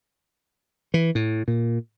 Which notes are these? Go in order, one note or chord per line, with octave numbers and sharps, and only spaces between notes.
E3
A2
A#2